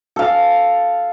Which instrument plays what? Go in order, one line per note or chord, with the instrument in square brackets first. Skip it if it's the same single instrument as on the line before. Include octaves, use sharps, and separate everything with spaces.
[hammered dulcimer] A4 F5